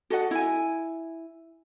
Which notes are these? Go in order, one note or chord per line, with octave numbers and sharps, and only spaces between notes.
F#4 A4 D#5 F#5
E4 G#5